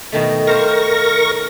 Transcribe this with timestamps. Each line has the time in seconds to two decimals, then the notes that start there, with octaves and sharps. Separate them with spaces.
0.12 B2 D#3 A3
0.47 A#4 C5 F5 C#6 A#6